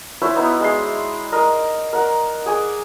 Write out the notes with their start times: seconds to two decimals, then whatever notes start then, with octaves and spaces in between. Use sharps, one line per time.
0.22 E4 F#4 C5 C#5
0.36 B3 D#4 E4
0.60 G#3 C6
1.32 A#4 D#5
1.93 A#4 F#5
2.46 G#4 G#5 D6